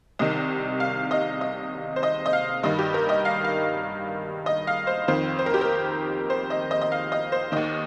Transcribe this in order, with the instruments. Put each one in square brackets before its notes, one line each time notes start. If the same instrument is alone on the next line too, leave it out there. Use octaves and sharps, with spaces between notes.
[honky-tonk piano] C2 C3 D#3 D#5
F5
D#5
D#5
C5
D#5
D#5
F5
G2 D#3 D#5
G4
A#4
D#5
F5
F5
D#5
F5
C5
F2 D#3 C5
C5
A#4
G4
A#4
C5
D#5
D#5
D#5
F5
D#5
C5
D#2 D#3 D#5